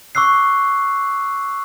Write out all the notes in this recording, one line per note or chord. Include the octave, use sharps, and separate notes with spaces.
C#6 D6 E6 F#6 C7